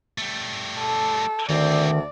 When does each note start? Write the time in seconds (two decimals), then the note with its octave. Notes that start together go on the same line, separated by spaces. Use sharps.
0.18 G3 A3
0.78 A4
1.49 D2 D#3 E3 C4 D5